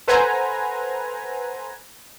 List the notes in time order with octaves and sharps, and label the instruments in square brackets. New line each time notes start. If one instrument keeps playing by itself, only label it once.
[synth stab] A4 B4 C5 F#5 G#5 A#5